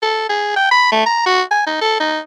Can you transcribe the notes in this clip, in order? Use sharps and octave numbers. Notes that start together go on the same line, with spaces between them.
A4
G#4
G5
B5
A3
A#5
F#4
G#5
D#4
A4
D#4